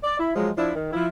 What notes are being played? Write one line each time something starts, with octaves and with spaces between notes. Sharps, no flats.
D5
E4
F3 F#3 G#3
F3 D4 E4
D#3
F3 E4